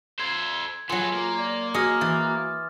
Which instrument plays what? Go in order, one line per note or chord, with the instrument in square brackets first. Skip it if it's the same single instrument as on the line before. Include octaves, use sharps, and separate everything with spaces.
[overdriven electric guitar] A4 C5 [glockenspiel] G#6
[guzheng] F#3 G#4 [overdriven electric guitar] B3 A4 [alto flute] F4 [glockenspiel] C6
[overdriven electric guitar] A#3
[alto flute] D5
[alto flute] F#4 [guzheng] G#4 C#5 D#5 [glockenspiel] D6 D#6 F6
[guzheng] E3 [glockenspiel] A6